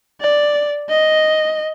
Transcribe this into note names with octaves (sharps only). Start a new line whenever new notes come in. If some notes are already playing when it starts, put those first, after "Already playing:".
D5
D#5